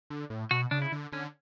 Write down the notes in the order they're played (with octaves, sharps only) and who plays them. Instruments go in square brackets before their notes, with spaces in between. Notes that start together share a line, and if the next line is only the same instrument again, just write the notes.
[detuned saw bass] D3
A2
[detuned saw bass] B2 [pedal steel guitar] F#4
[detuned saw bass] C#3 [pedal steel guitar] D4
[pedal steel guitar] E4
[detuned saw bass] D3
[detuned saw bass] D3 [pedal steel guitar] C#4